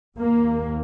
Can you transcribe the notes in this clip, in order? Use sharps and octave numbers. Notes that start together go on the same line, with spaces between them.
D#2 A#3